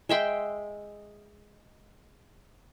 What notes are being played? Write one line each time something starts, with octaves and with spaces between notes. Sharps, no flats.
G#3 E5 G5 C6